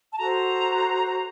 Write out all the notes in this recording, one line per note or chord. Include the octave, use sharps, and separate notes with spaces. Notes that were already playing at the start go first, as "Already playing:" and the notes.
A5
F#4 A4 C5 A#5
A#5